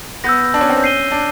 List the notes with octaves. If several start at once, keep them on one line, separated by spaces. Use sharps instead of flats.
B3 E6 G6 A#6
D4
C#4
C4
C#4
G6 C7 D#7 G7
D4